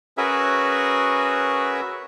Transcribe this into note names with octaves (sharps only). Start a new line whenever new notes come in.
C#4 F#4 G#4 A#4 B4 E5